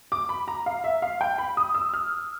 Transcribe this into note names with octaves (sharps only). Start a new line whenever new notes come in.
D6
B5
A#5
F5
E5
F5
G5
B5
D#6
E6
F6